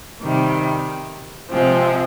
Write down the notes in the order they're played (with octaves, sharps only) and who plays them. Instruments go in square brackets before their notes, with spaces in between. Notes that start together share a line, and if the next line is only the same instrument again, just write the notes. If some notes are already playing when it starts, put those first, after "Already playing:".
[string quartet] C3 D#3 G3
C3 F3 G#3 C4